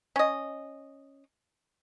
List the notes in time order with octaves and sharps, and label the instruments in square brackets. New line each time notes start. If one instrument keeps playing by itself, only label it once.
[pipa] C#4 D#5